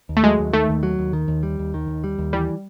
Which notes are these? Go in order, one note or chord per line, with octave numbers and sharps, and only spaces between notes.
D#2
A3
F#3 G#3
D#2
D#3 A3
D#2
F#3
D#2
D#3
D#2
G3
D#2
D#3
D#2
G3
D#2
E3 G3